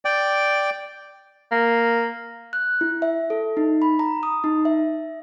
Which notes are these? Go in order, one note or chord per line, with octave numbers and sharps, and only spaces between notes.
D5 G5
A#3
F#6
E4
E5
A4
D#4
B5
A#5
D#6
D#4
E5